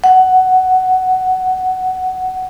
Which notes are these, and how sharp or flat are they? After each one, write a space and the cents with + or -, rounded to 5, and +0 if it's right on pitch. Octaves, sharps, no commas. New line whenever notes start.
F#5 +10